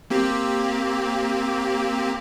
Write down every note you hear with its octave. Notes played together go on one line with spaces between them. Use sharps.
A#3 C4 G4